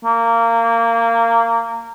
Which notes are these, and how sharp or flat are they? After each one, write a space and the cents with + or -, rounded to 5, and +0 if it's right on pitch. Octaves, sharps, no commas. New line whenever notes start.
A#3 -20